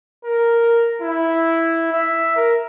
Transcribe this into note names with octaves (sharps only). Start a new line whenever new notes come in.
A#4
E4
E5
A#4